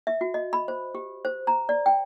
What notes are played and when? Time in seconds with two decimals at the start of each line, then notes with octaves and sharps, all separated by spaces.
0.07 E5
0.21 F#4
0.34 D#5
0.53 B5
0.68 C5
0.95 G4
1.25 C5
1.47 A#5
1.69 D5
1.86 G5